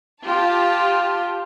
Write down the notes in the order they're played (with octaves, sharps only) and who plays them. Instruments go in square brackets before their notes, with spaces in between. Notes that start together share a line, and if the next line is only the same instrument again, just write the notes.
[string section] F4 G4 A5